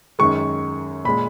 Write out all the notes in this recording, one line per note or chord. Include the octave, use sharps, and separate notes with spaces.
F#2 D#3 G#3 C#6
A#2 G#3 B5